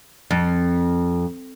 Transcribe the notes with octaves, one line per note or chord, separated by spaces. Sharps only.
F2